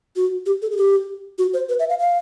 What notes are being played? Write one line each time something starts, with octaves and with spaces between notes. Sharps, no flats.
F#4
G4
A4
G#4
G4
F#4
C5
B4
E5
F5
F5